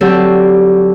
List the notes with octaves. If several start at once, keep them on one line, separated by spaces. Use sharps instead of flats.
D3 F#3 C4 G4 A4